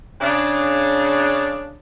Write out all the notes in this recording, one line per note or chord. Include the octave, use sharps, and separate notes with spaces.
C#3 D4